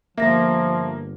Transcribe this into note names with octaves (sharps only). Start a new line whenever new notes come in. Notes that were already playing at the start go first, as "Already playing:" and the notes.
G1 F3 A#3 E5 A#6